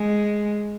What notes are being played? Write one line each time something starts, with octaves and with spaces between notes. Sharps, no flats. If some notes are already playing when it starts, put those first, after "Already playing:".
Already playing: G#3